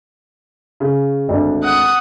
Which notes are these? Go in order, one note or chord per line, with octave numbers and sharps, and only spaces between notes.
C#3
G#1 D2 D4
F#5 D#6